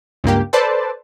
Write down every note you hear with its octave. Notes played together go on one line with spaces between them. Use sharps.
C#2 G2 A#3 G4
A4 B4 C5 D5 A5